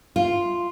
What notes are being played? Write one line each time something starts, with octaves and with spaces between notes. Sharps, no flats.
F4